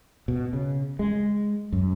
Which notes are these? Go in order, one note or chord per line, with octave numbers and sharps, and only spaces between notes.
B2
C#3
G#3
F#2